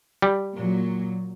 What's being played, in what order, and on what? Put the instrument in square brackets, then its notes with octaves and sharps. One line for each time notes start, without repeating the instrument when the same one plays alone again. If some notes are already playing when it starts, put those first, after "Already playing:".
[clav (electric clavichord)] G3
[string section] A#2 F#3